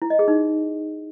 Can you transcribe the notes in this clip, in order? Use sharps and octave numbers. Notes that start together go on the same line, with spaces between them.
E4
D#5
G#4
D#4